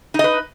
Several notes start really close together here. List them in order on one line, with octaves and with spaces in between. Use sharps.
D#4 D#5 B4